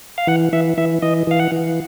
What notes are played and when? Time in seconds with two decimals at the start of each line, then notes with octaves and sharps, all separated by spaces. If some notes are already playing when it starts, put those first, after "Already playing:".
0.18 F5
0.27 E3 F#5
0.53 E3 E5
0.77 E3 E5
1.02 E3 D#5
1.27 E3 F5
1.40 F#5
1.52 E3